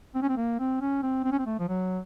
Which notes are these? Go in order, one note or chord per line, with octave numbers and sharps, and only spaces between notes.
C4
C#4
C4
A#3
C4
C#4
C4
C4
C#4
C4
A3
F3
F#3